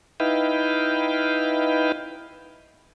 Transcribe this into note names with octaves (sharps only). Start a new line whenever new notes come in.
D#4 E4 B4 F5 G5